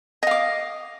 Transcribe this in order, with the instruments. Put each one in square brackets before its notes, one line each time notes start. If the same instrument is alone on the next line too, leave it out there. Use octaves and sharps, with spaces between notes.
[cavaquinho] D#5
F5
D6